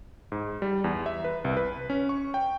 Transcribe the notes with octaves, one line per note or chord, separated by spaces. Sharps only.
G#2
G3
E2
E5
B4
C2
B4
C#4
C#6
G5